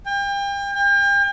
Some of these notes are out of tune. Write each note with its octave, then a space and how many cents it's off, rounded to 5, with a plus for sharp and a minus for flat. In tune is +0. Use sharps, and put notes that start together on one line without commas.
G5 +35
G5 +40